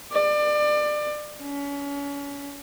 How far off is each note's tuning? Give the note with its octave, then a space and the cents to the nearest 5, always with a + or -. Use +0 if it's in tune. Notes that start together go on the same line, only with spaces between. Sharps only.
D5 +25
C#4 +35